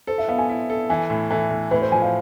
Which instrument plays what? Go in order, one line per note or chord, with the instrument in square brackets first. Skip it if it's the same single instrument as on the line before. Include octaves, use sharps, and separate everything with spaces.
[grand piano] A4 [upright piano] C5
[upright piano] E5
[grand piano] B3 [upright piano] F5
[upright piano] G#5
[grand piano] E4
A4
[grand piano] E3 [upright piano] G#5
[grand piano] A2
[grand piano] E3 [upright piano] A4
[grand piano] A2
[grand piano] A2 [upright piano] B4
[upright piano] C5
[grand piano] F3 [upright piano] G#5
[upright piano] F5